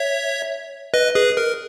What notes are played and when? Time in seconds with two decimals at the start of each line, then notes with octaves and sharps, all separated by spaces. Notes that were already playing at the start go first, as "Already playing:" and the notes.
Already playing: C#5 E5
0.94 B4 D#5
1.15 G#4 B4
1.37 A#4